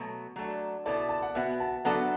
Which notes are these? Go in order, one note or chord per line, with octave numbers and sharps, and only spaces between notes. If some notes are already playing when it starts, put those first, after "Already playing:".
Already playing: B2 F#3 A3
F#3 A3 D4
B2 B3 E4 A4 D5
A5
F#5
B2 B3 F#4 E5
A5
F#3 B3 D4 F#4 A4 F#5